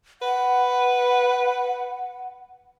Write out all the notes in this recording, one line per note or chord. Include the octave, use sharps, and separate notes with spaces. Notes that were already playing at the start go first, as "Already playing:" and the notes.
B4 F#5